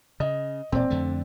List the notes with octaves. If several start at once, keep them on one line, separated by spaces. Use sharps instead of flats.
C#3 D#5
E1 A#2 C4 D5
F2 D3 A3